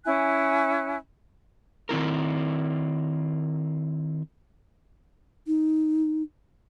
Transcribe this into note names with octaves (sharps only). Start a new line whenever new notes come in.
C#4 E4 G#5 F#6
D#3 C4 E4 A#4
D#4